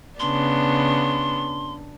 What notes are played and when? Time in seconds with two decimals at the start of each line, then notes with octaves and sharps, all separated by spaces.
0.20 C#3 B3 D4 C6